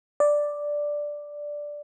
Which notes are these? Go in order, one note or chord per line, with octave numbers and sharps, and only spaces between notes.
D5